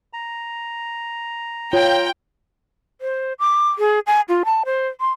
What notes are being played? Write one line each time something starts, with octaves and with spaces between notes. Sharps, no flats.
A#5
F4 C#5 G5
C5
D6
G#4
G#5
F4
A5
C5
C6